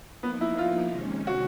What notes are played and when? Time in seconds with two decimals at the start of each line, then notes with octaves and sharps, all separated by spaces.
0.23 F3 A#3 B3 D#4
0.41 E4
0.58 F4
0.91 C3 D#3 G#3 C#4
1.27 F#4